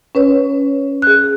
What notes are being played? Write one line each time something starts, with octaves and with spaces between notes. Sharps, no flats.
C#4 B4 C#5
G#4 F#6